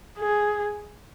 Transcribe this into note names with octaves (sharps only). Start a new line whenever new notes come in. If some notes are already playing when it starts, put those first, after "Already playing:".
G#4